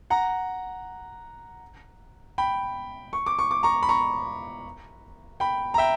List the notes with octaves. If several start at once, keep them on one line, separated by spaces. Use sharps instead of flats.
F#5 A#5
G5 B5
C#6
D6
C#6
D6
A#5 C#6
B5
A#5 C#6
G5 B5
A#5
E5 G5